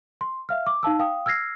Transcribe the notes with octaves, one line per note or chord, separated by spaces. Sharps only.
C6
E5 F5 F6
D6
D#4 F5 A5 E6
F5 G5 D#6
E6 F6 G#6 A#6 C7